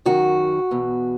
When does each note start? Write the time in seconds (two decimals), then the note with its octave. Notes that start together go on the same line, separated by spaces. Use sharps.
0.06 F#2 D#3 F#4
0.71 E2 B2